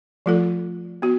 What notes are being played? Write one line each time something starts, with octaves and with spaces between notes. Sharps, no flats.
F3 A3 F4 A4
B3 F#4